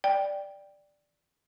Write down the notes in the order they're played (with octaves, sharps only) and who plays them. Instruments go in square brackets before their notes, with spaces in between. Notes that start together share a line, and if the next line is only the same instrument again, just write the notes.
[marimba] D5 G5